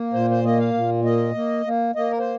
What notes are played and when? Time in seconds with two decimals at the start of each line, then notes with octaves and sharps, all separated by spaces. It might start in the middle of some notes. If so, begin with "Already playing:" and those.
Already playing: A#3
0.13 A#2 C5
0.30 C5
0.44 A#3 D#5
0.58 F5
0.74 A#2
1.05 A#3 D#5
1.34 A#3
1.66 A#3
1.95 A#3 D#5
2.11 A#4
2.19 C5